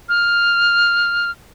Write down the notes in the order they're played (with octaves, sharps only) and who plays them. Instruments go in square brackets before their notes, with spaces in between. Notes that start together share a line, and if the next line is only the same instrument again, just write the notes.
[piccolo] F6